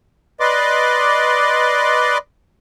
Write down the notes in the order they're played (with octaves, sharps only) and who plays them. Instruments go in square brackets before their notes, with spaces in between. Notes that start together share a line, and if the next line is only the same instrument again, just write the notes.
[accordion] B4 D5 D#5 C6 D6